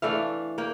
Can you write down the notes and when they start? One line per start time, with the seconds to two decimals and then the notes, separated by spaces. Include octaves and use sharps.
0.02 E3 A3 D4 F5
0.58 A#3 G5